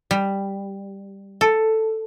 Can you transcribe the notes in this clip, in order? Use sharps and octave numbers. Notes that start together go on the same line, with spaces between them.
G3
A4